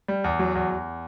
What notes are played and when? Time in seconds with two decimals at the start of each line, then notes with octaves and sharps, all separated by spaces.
0.08 G3
0.24 E2
0.39 F#3
0.55 E2
0.71 E2